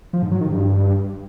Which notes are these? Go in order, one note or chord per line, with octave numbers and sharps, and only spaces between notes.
F3
G#2
F#3
D#3
G2